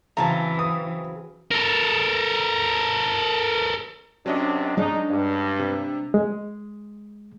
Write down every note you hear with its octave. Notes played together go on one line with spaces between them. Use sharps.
C#3 E3 F#3 C4 A5 A#5
D#6
A4 A#4
F#2 C3 F#3 C#4 D4 D#5
G#3 D4 D#4
G2
C3
G#3